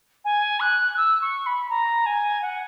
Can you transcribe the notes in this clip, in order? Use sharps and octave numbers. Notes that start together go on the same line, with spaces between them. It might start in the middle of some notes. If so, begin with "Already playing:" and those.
G#5
F#6
E6
C#6
B5
A#5
G#5
F#5